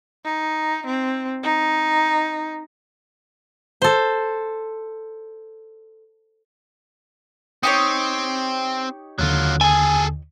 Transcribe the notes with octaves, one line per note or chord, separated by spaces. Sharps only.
D#4
C4
D#4
A4 C5
C4 D#4 G4 C#5
D#2 D3 F#3 F4
G#4 A4 G#5